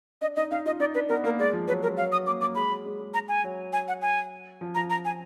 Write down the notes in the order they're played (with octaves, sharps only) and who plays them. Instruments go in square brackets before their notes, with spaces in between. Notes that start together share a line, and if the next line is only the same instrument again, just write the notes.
[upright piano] D4 [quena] D#5
[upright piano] D#4 [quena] D#5
[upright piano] D#4 [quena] F5
[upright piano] F4 [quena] D#5
[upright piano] D#4 [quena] D5
[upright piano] D4 [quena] B4
[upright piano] B3 [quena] A#4
[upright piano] A#3 [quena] A#4
[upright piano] G#3 [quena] D5
[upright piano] F3
[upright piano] F#3 [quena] B4
[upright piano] G#3 [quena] A#4
[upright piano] F#3 [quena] F5
[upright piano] F#3 [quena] D#6
[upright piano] A#3 [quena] D6
[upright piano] A#3 [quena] D6
[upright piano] G#3 [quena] B5
[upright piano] F#3
G#3
G#3
[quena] A#5
G#5
[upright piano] F#3
[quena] G#5
F#5
G#5
[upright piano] F3
[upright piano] F3 [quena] A#5
[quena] A#5
G#5